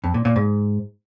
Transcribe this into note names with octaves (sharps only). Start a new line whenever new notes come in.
F2
A#2
A#2
G#2